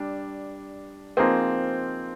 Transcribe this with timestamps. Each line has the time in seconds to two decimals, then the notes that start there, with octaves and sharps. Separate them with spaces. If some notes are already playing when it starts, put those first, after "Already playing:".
Already playing: G3 D4
1.17 F3 A#3 C4 D#4 G#4